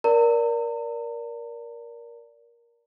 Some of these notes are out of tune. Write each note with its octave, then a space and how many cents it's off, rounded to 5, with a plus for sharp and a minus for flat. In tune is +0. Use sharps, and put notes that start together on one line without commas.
A#4 +15 D5 -15 A#5 -40